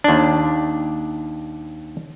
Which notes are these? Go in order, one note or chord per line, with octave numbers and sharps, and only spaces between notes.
D#2 D4